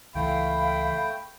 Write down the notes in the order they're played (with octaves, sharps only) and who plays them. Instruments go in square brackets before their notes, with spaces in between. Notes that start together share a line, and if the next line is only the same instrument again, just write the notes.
[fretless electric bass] C#2 E3 [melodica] A3 G5 [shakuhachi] F5 [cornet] B5